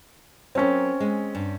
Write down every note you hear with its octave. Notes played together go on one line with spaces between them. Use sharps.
F#3 A#3 C4 C#4
G#3
G2